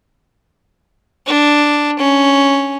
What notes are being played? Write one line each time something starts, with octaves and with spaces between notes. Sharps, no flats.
D4
C#4